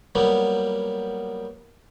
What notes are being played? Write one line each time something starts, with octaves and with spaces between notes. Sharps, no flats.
F#3 G3 A#3 B3